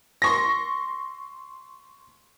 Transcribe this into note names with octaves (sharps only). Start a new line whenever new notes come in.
C6 C#6 A#6